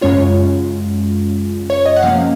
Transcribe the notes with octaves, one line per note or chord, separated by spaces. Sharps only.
F#2 C#3 G#3 C#4 F4 C#5
C#5
D#5
F#5
C3 F3 A#3 C#4 F5